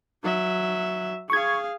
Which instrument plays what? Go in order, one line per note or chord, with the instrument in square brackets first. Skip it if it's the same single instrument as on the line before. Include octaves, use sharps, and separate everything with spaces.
[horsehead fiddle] F#3 E5
[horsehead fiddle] G#4 F5 [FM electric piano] C#6 G#6